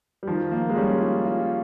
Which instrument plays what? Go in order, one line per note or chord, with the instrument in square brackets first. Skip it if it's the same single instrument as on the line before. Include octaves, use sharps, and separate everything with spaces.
[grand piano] G3
[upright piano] D#3 [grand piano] F3
[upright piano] A#3
[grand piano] G#3
[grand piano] G3 [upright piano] C#4
[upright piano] F4
F4